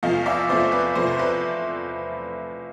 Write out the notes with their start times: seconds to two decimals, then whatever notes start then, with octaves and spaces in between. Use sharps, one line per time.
0.03 E2 C3 F3 A3 D#5 F5
0.26 D5 E5
0.49 E2 C3 F3 A3 C5 D5
0.72 B4
0.95 E2 C3 F3 A3 C5
1.07 C5
1.19 B4